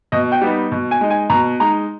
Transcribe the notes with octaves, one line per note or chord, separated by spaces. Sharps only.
B2 D#5
G5
G3 B3 D#4
B2
G#5
G#3 D#4
G#5
B2 A#5
G#3 D#4 A#5